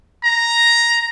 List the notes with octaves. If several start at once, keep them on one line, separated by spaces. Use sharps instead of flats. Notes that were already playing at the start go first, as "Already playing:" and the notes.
A#5